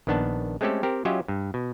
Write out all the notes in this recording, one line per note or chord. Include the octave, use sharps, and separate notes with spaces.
A#1 D#3 B3 D4 A5
G#3 A3 C4 C#4 G4 A4
C4 G4 A#4
F#3 C#4 F4 G4 D#5 E5
G2
B2